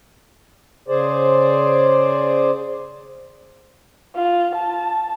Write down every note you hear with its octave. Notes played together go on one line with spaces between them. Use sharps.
C#3 G#4 C5 D5
F4
A5